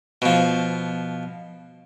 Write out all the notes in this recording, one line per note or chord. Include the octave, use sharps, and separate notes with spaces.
B2 F3